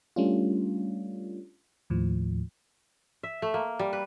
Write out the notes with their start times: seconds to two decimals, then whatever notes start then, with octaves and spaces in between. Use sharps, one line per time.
0.16 G3 A3 C#4 D4 F4
1.90 D#2 A2 F3
3.23 E5
3.42 A3
3.54 A#3
3.79 G3
3.93 B4